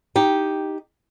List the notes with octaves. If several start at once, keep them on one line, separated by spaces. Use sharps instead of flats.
D#4 G4